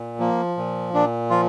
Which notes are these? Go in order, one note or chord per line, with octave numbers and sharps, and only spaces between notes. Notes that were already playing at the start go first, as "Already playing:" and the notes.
Already playing: A#2
F3 A#3
A#2
A#2 D4
F3 F4